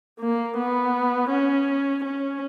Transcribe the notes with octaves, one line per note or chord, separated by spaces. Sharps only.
A#3
B3
C#4
C#4